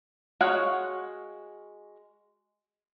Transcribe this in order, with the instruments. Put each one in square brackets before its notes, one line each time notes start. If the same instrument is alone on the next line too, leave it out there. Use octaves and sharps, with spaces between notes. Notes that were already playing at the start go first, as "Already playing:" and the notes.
[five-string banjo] G#3 F#4 C#5 F5 F#5